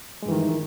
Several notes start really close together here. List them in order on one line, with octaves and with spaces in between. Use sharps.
G#3 G2 E3 D#3